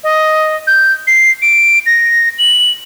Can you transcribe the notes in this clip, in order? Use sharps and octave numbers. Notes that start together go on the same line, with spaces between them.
D#5
G6
C7
D7
A#6
F#7